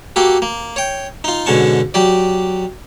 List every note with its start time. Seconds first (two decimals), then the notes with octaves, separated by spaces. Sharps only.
0.16 A#3 F#4 G4 A4
0.42 A#3
0.76 C#5 G5
1.24 D#4 F4
1.46 G#2 B2 D3 C#4 A5 C#6
1.94 F#3 G4 D5